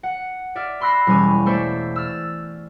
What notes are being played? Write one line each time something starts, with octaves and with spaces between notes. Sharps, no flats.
F#5
D5 E5 F6
B5 C6 E6 F#6 A#6 C7
E1 G3 C#4 G#5
A3 A4 C5 D5 E5
E6 F6 A6